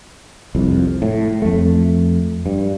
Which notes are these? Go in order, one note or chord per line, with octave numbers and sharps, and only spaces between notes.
C2 F2
A2
F2 A3
G2